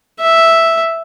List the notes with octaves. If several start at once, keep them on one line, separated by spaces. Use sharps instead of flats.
E5